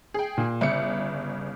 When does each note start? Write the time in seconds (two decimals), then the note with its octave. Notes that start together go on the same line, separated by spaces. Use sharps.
0.14 G#4 G5
0.38 A#2
0.61 G1 C#3 E5 C#7